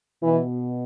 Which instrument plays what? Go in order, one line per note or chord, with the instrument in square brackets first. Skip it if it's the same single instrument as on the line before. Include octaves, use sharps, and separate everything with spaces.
[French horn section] B2 E3